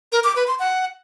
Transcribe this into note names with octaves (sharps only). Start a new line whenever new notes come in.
A#4
D6
B4
C6
F#5